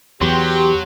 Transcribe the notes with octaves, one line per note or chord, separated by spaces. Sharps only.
E2 F#3 G4 C6